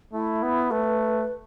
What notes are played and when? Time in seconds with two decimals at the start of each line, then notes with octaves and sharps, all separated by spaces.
0.13 A3 E4
0.42 B3
0.71 A3 B4